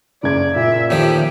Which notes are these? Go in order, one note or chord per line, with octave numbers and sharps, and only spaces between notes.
F#1 D5 G#6
A#2 E5
D#2 A2 F3 G4